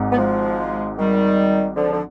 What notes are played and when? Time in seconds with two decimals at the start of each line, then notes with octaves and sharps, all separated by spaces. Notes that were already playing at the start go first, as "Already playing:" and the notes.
Already playing: G#1 G#2
0.12 B3
0.18 F3 G#3
0.98 D#3 G3
1.76 D3 F3
1.93 D3